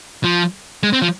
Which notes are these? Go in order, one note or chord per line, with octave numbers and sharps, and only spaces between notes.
F3
G#3
C4
F3